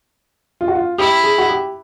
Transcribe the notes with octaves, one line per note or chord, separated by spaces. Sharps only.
F4
F#4
F4
E4 G4
G#4
F#4
G4